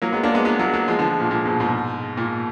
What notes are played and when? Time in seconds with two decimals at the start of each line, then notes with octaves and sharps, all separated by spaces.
0.02 F#3 A#3
0.12 G#3 B3
0.23 A#3 D4
0.34 G#3 B3
0.45 G#3 B3
0.59 F#3 A#3
0.74 F#3 A#3
0.88 F3 G#3
0.99 D3 F3
1.20 A#2
1.31 A#2
1.45 G#2 B2
1.60 G#2 B2
2.17 A#2